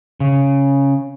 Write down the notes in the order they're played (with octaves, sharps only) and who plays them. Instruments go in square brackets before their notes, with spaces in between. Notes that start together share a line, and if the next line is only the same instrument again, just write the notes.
[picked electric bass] C#3